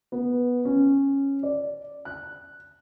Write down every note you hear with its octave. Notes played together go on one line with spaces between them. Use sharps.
B3
C#4
D5
F#6